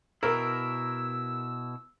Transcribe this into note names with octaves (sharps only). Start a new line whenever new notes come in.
B2 E4 A#4 E6